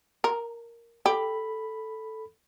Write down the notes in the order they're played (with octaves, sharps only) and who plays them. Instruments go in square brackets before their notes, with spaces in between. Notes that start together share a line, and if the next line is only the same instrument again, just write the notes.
[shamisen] A#4
[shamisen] G4 [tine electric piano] A4 B5